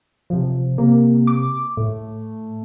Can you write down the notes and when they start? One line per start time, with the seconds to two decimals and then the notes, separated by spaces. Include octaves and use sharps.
0.30 C3 F3
0.78 C3 A#3
1.27 D6
1.77 A2 A3